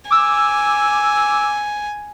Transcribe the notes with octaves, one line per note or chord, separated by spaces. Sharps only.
G#5 D6 E6